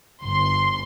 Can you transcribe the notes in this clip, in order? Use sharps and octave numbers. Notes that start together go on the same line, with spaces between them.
G1 C6